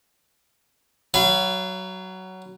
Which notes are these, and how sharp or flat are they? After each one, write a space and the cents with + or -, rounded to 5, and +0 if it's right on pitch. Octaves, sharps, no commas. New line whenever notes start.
F#3 +15 F5 -35 B5 +0